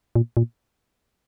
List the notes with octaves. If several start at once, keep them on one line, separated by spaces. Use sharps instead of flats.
A#2
A#2